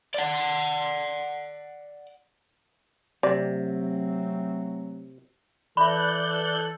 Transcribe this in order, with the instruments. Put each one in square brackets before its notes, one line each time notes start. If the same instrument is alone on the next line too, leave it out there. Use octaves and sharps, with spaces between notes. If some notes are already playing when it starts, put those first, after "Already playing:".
[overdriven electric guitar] D5 F#5
[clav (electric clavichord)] C3 [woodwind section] F#3 A3 C4 [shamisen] D5
[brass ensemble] E3 A4 [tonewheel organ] D5 F#6 G6 [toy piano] E5 B5